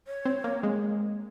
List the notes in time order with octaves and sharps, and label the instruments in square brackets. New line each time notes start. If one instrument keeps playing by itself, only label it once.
[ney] C#5
[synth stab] C4
A#3
G#3